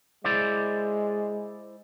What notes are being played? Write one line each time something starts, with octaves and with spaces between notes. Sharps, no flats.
G#3 E4 C5 D5